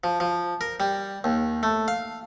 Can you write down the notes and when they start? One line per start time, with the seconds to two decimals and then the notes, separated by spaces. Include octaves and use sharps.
0.04 F3
0.20 F3
0.61 A#4
0.80 G3
1.24 D#2
1.63 A3
1.88 F5